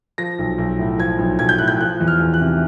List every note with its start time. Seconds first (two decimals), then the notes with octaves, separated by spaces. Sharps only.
0.18 F3 A#6
0.39 B1
0.58 B1
0.79 A2
0.99 F3 G#6
1.19 B1
1.39 B1 G#6
1.49 G6
1.58 A2 F#6
1.68 G6
1.79 F3 F#6
2.00 E2
2.08 F6
2.20 E2
2.34 F#6
2.41 C3